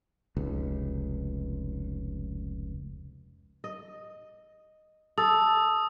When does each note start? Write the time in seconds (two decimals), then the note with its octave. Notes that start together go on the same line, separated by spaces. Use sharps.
0.37 F1 C#2
3.64 D#5
5.18 A4 D#6